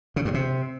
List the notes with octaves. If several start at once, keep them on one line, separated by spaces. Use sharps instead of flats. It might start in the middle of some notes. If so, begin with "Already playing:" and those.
C#3
G2
C3